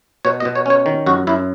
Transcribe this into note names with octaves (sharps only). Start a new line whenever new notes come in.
B2 C#5
D#5
B2
C#5
C#4 C#5
D#3
F#2 F#4
F#2 E4